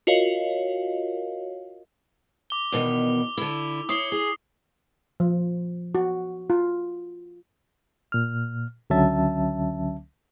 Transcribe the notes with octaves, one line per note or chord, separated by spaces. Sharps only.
F4 F#4 A#4 C#5 D#5 F5
D6 G7
E2 B2 D#3
D3 E4
E4 C#5 D#6 C7 G7
G#4
F3
F#4
F4
A#2 F6
C#2 D3 F#3 C#4 E5 A5